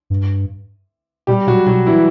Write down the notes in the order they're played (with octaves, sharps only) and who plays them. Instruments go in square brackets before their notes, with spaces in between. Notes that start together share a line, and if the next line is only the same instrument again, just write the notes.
[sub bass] G2
[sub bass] B2 [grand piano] G3 G4
[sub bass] B2 [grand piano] F#3 F#4
[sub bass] B2 [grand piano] F#3 F#4
[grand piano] E3 E4